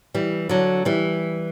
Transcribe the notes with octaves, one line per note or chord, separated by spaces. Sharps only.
E3 G3
D3 F#3
E3 G3